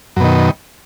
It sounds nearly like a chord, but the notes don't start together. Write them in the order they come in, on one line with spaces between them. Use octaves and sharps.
F#2 B2 D#3